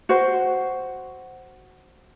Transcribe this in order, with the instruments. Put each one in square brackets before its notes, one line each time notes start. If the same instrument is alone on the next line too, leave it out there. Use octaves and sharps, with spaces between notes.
[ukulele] F#4 C5